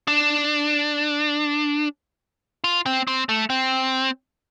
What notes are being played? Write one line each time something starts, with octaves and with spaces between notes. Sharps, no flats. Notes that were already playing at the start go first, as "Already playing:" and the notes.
D4
F4
C4
C4
A3
C4